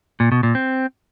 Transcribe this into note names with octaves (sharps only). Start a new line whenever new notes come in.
A#2
B2
A#2
C4